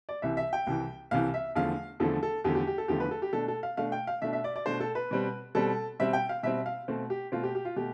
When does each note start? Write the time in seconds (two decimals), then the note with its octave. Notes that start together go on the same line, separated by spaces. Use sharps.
0.09 D5
0.22 C2 C3 E3 E5
0.37 E5
0.53 G5
0.67 C2 C3 E3
1.11 C2 C3 E3 F5
1.34 E5
1.55 E2 D3 F3 A3 F5
2.00 E2 D3 F3 A3 A4
2.23 A4
2.44 E2 D3 F3 A3 G4
2.55 G4
2.67 G4
2.78 A4
2.88 E2 D3 F3 A3 G4
3.00 B4
3.11 A4
3.22 G4
3.33 B2 A3 D4 A4
3.48 A4
3.63 F5
3.77 B2 A3 D4 F5
3.92 G5
4.07 F5
4.22 B2 A3 D4 E5
4.33 E5
4.44 D5
4.56 D5
4.66 B2 A3 D4 C5
4.80 A4
4.95 B4
5.11 B2 G3 C4
5.55 B2 G3 C4 A4
6.00 B2 G3 C4 E5
6.13 G5
6.29 F5
6.43 B2 G3 C4 E5
6.66 F5
6.88 B2 A3 C4
7.10 G4
7.32 B2 A3 C4 F4
7.43 G4
7.55 G4
7.65 F4
7.76 B2 A3 G4